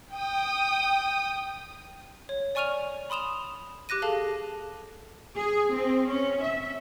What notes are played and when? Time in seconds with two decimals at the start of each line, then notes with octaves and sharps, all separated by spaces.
0.12 G5 D#6
2.29 C#5
2.55 D5 G#5 C#6 F6 D#7 F7
3.10 B5 C6 D#6 E7 F7
3.89 G4 D6 F#6 A#6 D#7
4.02 G#4 A4 F5 A5
5.36 G#4
5.72 C4
6.09 C#4
6.42 E5